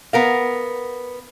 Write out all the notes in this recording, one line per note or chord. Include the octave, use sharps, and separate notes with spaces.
B3 A#4 F5